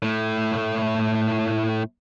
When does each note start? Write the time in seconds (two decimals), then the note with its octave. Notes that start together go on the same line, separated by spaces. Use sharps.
0.02 A2 A3